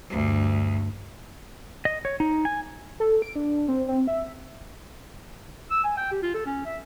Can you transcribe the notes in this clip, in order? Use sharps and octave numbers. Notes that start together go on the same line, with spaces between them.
D2 G2
D#5
C#5
D#4
G#5
A4
D7
D4
C4
C4
E5
E6
G#5
G5
G4
F4
A4
C#4
E5